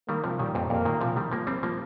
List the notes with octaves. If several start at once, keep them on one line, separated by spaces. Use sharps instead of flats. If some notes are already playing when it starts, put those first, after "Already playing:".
D#3 G3 A#3
C3 F3
A#2 D#3 G3
F2 A#2
F2 A#2 A#3
A#2 D#3
C3 F3
D#3 G3
F3 A#3
G3 C4
F3 A#3